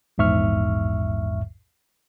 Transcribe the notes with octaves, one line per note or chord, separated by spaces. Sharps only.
A#1 E2 G#2 E5 C#6 F6